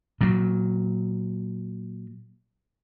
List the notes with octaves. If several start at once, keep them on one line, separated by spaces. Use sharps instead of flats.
A#2 F#3